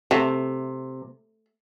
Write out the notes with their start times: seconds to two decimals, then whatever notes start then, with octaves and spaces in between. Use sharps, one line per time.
0.11 C3 A3